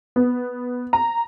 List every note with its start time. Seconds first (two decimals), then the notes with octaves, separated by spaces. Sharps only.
0.16 B3
0.93 A#5